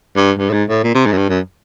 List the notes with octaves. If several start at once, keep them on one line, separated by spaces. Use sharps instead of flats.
G2
G2
A2
G#2
A2
A#2
C3
G#2
F#2
G2
F#2